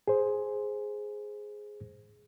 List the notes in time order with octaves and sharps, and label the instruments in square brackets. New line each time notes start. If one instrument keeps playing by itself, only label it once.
[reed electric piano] G#4 C5